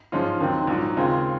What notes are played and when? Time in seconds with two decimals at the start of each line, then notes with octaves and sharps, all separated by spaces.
0.12 G#2 F3 G#3 C#4 F4
0.40 D#2 D#3 F#3 C4
0.67 A#1 G#2 F#3
0.97 D#2 C#3 G#3 C4 F4